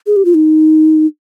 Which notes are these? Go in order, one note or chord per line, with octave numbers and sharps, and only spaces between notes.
G#4
G4
F4
D#4